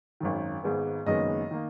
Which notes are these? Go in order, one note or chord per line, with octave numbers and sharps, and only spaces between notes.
G#1 F#2 D#3
G#1 G#2 D#3 G#3 B3
F#1 F#2 D#3 G#3 B3 D#5
D#3 A#3